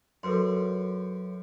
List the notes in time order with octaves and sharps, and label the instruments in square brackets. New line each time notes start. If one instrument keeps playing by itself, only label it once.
[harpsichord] F#2 [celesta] A4 B4 C6